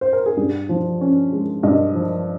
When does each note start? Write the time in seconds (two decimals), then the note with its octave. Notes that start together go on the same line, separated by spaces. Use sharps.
0.01 C5
0.12 A#4
0.26 G#4
0.37 G2 G4
0.69 F3
1.01 C#4
1.33 G#3
1.63 G2 D#5
1.95 F3